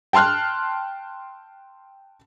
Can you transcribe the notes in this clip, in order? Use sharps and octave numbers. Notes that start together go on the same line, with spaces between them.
G5 A5 C6 F6 F#6